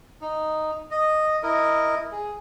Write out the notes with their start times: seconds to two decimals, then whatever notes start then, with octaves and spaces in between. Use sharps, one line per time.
0.21 D#4
0.91 D#5
1.43 E4 A#4 D#5
2.12 G#4